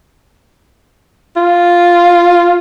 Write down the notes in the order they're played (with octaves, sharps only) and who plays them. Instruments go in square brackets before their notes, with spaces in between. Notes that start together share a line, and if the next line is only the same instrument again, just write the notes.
[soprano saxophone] F4